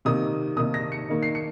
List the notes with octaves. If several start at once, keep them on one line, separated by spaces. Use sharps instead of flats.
C3 D#3 A#3 D#4 D#6
C3 D#3 A#3 D#4 D#6
A#6
C#7
D#3 A#3 D#4
C7
C#7